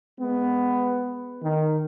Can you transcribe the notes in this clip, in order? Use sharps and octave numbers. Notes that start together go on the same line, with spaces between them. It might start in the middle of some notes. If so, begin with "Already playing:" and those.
G#3 B3
D#3